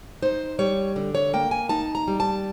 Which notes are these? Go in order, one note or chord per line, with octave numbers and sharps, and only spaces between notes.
D#4 C5
G3 C#5
D3
C#5
A#3 G5
G#5
D#4 A5
A#5
G3
A5